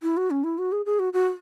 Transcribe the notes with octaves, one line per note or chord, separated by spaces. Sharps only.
E4
F#4
C#4
E4
F#4
G#4
G#4
F#4
F#4